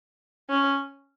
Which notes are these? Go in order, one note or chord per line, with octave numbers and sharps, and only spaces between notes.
C#4